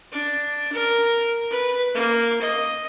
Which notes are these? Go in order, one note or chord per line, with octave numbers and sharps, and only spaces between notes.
D4
A#4
B4
A#3
D#5